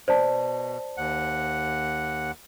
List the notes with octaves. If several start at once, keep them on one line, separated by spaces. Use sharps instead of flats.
B2 C5 D5 A5
D#2 F#5